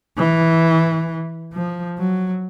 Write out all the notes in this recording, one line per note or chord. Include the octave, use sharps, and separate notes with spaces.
E3
F3
F#3